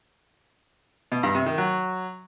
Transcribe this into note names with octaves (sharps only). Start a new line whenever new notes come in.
B2
G2
C3
D#3
F#3